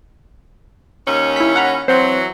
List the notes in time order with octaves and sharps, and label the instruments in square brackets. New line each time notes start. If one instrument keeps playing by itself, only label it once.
[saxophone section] D#2 C#4
[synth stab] E4 B6
F#5 A#5 B5
[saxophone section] E3 F#3 [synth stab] C4 C5